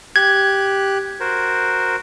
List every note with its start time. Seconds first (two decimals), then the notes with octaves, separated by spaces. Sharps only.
0.16 G4 F#6 G#6
1.20 F#4 A#4 C5